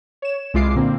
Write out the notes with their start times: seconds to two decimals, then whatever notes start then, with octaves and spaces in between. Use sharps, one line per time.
0.22 C#5 E7
0.54 C2 G#3 E4 F4 D6 C7
0.75 A#2 D3 A#3 C4